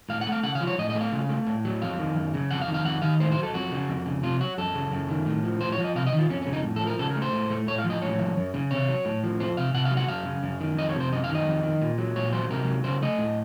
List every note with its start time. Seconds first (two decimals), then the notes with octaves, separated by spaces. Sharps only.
0.09 A2 F5
0.21 F#5
0.27 A3
0.32 F5
0.43 C#3 F#5
0.55 F5
0.60 F3
0.67 C#5
0.79 A2 D#5
0.90 D#5
0.95 A3
1.01 F5
1.12 C#3
1.29 A3
1.47 A2
1.65 F#3
1.82 F2 F5
1.99 D#3
2.15 F#2
2.34 C#3
2.51 F2 F#5
2.61 F5
2.67 D#3
2.74 F5
2.85 F2 F#5
3.02 D#3 F5
3.20 A2 C5
3.31 C5
3.37 F#3
3.43 A4
3.53 F2 F#4
3.71 C#3
3.88 F2
4.06 C#3
4.23 C3 F4
4.40 F#3 F#4
4.58 F#2 A4
4.74 C#3
4.92 F#2
5.08 D#3
5.26 A2
5.44 F3
5.61 A2 C5
5.72 C#5
5.78 F3
5.84 D#5
5.96 C3 F5
6.07 D#5
6.13 D#3
6.19 F4
6.29 F2 C#4
6.42 C#4
6.46 C#3
6.53 D#4
6.64 A2
6.76 A4
6.81 F3
6.87 A#4
6.99 C#3 A4
7.10 A#4
7.16 A3
7.22 C5
7.33 A2
7.50 A3
7.67 A2 C#5
7.78 F5
7.84 F3
7.90 D#5
8.02 A2 C#5
8.19 F3
8.37 F#2
8.54 C#3
8.71 C3 C#5
8.89 F#3
9.05 A2
9.23 F3
9.40 F2 C5
9.57 C3 F5
9.74 C3 F#5
9.85 F5
9.91 F#3
9.97 F#5
10.08 F#2 F5
10.26 C#3
10.43 F#2
10.60 D#3
10.77 F2 D#5
10.89 C#5
10.96 C3 C5
11.12 F#2 D#5
11.24 F5
11.29 D#3
11.35 D#5
11.46 F2
11.63 D#3
11.82 A#2
11.98 F#3
12.16 A#2 C#5
12.32 F#3 C5
12.50 C3 A#4
12.67 F#3
12.84 C#3 C5
13.02 A3 D#5
13.18 A2